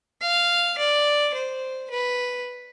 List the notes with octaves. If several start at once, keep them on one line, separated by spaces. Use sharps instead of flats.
F5
D5
C5
B4